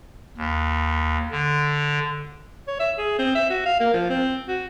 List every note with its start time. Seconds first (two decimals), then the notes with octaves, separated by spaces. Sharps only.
0.37 D#2
1.31 D3
2.68 C#5
2.80 E5
2.98 G#4
3.19 C4
3.35 E5
3.50 F#4
3.66 F5
3.80 A#3
3.94 F3
4.10 C4
4.49 F#4